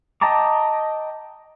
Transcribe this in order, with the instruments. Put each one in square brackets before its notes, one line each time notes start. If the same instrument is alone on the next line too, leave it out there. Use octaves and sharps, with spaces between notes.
[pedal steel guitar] D#5 G5 A5 A#5 D6